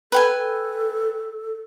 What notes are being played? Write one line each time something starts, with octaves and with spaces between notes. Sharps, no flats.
A4 B4 G5 G#5